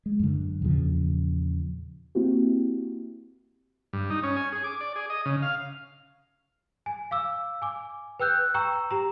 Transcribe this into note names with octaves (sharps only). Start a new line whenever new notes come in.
G#3
F#2 D3
E2 A#2 C#3 F3
A#3 C4 E4 F#4 G4
G2
D#4
C#4
G#5
G#4
D6
D5
G#4
D#5
C#3
F5
G#5
F5 D6 E6
G#5 D6
B4 G5 E6 F#6 G6
G5 A#5 C#6 E6
G4 A#5